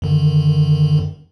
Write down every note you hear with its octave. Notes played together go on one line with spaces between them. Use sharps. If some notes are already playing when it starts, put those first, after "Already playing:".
F#2 D3 D#3